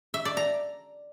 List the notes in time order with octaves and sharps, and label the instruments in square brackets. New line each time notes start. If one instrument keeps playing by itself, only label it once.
[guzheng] E5
D5
A#5